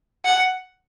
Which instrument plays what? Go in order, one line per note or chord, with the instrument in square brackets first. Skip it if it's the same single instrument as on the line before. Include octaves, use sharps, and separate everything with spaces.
[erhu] F#5